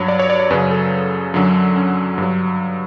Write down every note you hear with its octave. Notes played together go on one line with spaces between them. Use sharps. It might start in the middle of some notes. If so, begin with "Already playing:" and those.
Already playing: G2 F#3 C#5
D5
C#5
D5
C#5
F#2 C#3 F#3 B4
A4
F#2 D3 F#3
C#4
G2 F#3